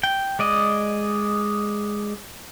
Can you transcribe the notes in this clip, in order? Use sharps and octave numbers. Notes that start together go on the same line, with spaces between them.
G5
G#3 D5 D#5